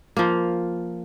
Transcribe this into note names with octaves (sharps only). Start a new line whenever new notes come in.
F3 A#3